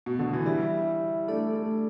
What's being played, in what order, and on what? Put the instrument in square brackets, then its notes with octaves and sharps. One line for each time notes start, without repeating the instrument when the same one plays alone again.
[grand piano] B2
D3
E3
[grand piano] G3 [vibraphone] E4 G4 E5
[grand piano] A3 [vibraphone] D4 A4 D5
[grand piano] A3